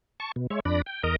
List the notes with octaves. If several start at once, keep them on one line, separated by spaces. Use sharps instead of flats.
A5 C#6
B2
G#3 C#5 E5
F2 D4 D5 B5 A#6
G5
E2 A#4 D#5 A#5